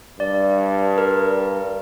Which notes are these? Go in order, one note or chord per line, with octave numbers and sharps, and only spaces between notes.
G2 D5
A#4